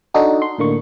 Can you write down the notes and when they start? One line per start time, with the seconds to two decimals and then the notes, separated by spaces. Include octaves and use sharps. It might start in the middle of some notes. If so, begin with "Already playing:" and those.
0.14 D4 D#4 F#4 A4
0.42 C6
0.58 A2 D3 A#3 C#6